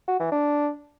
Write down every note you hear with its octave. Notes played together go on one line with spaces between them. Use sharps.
F#4
E3
D4